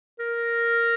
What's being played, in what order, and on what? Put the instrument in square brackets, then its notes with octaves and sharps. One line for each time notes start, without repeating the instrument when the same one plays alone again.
[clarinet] A#4